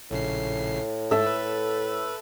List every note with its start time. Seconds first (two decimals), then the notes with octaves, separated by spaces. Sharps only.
0.11 A#1 A2 C#3 C7
1.11 G#2 A4 E5 A5
1.26 B4